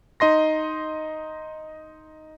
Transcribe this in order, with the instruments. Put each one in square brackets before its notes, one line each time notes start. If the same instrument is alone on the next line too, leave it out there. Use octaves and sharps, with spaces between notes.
[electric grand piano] D#4 D#5 C6 A#6